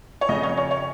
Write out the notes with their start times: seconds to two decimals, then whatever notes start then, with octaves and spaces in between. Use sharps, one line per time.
0.21 C#5
0.29 F2 C#3 D#5
0.43 C#5
0.57 C#5
0.71 C#5